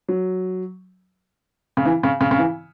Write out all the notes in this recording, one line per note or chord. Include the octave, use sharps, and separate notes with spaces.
F#3
C#3
E3
C#3
C#3
C#3
E3